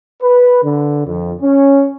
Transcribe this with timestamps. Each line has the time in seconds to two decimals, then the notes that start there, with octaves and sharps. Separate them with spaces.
0.23 B4
0.63 D3
1.07 F2
1.41 C#4